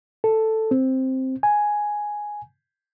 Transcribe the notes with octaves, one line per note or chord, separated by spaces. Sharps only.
A4
C4
G#5